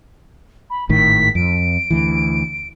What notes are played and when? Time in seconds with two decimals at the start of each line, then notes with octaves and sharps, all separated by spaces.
0.70 B5
0.89 G#1 A2 D#3 B6
1.35 F2 D7
1.90 D2 E3